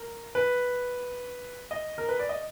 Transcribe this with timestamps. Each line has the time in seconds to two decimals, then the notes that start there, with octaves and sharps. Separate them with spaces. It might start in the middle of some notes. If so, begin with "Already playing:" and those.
Already playing: A#4
0.35 B4
1.71 D#5
1.98 A#4
2.09 B4
2.19 D5
2.29 D#5